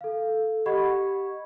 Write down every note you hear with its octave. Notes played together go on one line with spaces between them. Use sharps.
A4 F5
G4 D#5 F#5 B5 C#6 G#6